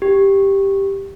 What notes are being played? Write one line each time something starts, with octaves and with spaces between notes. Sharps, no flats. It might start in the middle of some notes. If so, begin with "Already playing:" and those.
G4